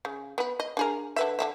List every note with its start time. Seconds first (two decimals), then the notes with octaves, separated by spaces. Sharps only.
0.05 C#3
0.38 B3 B4
0.60 D#5
0.77 D4 G#4 A#4
1.16 D3 B4 E5
1.39 D3 B3 E5